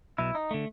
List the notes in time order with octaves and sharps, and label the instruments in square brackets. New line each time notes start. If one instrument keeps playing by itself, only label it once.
[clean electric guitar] B1 B2 E4
D#4
D3 A3